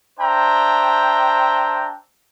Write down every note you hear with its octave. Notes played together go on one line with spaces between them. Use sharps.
D4 C5 E5 G5 A#5